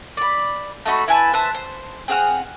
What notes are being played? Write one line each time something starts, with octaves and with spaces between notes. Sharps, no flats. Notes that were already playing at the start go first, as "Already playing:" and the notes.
D5 B5
A3 D#4 F#4 B5
E4 B4 G#5 A5
B4 C5 E5 A5
C5
C4 G#4 F#5 F6